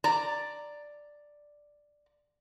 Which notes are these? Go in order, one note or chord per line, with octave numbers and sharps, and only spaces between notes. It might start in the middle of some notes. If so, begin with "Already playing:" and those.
D5 A#5